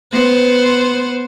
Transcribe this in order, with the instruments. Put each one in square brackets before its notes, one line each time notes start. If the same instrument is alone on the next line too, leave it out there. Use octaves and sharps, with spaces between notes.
[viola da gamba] B3 C5